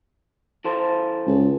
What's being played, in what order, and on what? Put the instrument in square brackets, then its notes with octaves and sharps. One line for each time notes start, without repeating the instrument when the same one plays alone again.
[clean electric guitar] E3 A4 C5
[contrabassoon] C#2